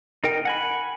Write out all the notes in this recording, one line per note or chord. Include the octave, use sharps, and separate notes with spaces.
D#4 A#4 G5
F#5 G#5 B5